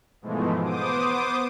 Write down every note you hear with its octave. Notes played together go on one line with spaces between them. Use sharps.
G#2 B2 E3 F3 G#3 A3
B3 C5 D6 D#6